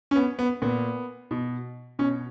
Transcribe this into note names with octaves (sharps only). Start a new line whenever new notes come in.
C#4
B3
B3
A#2 B3
B2
B2 C#4